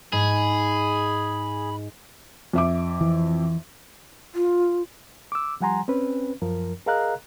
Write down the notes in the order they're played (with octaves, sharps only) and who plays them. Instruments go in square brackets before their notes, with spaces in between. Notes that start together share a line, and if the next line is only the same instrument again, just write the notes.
[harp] G#2 G#3 [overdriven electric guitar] G#4 [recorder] B5
[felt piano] F2 E5 D6
[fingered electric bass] E3
[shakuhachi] F4
[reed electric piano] D6 E6
F3 G3 F#5 G#5 A#5 C6
C4 C#4 B4
F#2 F3 A#4
G#4 A#4 D#5 F5 A#5 F#6